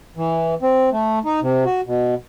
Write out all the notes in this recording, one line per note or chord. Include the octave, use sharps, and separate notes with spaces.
E3
C4
A3
D#4
C3
F#4
B2